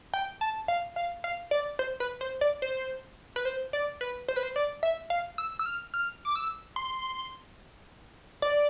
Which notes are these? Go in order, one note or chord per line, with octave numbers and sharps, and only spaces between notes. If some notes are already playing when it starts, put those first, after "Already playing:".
G5
A5
F5
F5
F5
D5
C5
B4
C5
D5
C5
B4
C5
D5
B4
C5
B4
C5
D5
E5
F5
E6
E6
F6
F6
D6
E6
C6
D5